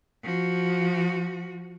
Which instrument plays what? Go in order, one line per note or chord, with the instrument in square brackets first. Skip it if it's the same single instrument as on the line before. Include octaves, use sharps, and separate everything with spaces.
[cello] F3 F#4